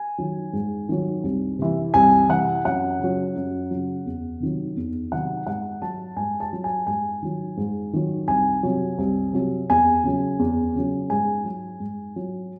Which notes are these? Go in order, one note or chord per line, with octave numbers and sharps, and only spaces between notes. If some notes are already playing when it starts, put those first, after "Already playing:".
Already playing: G#5
D#3 F#3
G#2
D#3 F#3
C2
C3 E3
C2 G#5
C3 E3 F#5
F#2 F#5
C#3 F#3
F#2
C#3 F#3
E2
C3 D#3 F#3
E2
C3 D#3 F#3 F#5
G#2 F#5
F#3 A5
G#2 G#5
A5
F#3
G#5
G#2 G#5
D#3 F#3
G#2
D#3 F#3
C2 G#5
C3 F#3
C2
C3 F#3
E2 G#5
C#3 F#3
E2
C#3 F#3
G#2 G#5
F#3
G#2
F#3